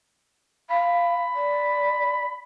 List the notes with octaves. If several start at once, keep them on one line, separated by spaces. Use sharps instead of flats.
F5 B5
D5